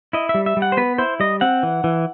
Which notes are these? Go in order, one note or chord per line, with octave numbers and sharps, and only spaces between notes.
E4 D#5
E5
G3
E5
G3
F#5
C5
B3 B4
E4 C5
G3 D#5
C4 F#5
E3
E3